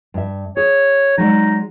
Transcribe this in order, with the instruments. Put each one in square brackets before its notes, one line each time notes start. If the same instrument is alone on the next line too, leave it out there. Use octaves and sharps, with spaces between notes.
[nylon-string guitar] G2 E5
[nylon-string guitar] G#4 [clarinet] C#5
[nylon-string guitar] F#3 G#3 D5 [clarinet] D#4